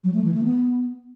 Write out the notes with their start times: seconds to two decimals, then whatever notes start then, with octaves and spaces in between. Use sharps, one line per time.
0.04 F#3
0.14 A3
0.24 E3
0.34 A3
0.44 B3